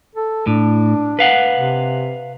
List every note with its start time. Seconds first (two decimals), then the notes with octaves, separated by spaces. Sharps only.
0.15 A4
0.47 A2 D4
1.19 B4 F5 F#5
1.53 C3